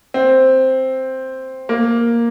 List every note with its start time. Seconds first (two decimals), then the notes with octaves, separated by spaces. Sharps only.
0.14 C4
1.69 A#3